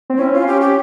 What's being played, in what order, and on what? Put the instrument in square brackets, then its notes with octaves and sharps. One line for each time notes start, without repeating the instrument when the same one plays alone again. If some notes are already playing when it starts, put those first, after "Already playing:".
[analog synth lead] C4
[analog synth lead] C#4 [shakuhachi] E4
[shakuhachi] F4
G4
G4